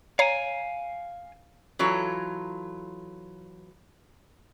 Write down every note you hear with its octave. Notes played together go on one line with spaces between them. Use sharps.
C#5 F5 G#5 A#5
E3 F#3 F4 A4